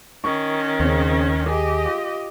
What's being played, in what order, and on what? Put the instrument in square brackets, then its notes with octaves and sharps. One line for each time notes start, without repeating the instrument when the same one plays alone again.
[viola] D#3 C#4 [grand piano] C#6
[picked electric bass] D#2 [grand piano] C#3 C4
[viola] G4 D#5 [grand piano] G#4
[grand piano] F4